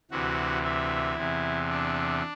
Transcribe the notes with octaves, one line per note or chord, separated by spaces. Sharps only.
D2 C3 E3 F#4
E4
E2 C3 E3
D4